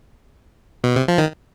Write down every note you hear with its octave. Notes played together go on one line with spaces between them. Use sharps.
B2
C3
F3
D#3